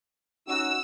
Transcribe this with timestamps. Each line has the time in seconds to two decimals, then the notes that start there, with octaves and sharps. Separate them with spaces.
0.49 C#4 D#4 F#4 E6